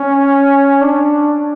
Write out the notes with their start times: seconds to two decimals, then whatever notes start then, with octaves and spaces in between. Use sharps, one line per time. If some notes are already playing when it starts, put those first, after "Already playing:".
Already playing: C#4
0.81 D4